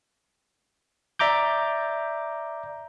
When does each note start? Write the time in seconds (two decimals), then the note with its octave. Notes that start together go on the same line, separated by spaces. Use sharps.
1.19 D5 E5 A#5 D6 G6